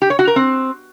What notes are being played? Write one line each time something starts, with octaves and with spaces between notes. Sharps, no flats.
G4
C#5
F#4
A#4
C4